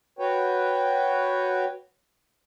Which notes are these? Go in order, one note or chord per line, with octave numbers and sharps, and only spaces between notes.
F#4 B4 C#5 G5